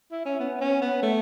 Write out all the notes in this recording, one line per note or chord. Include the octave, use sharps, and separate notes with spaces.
E4
C#4
B3
C#4
B3
A3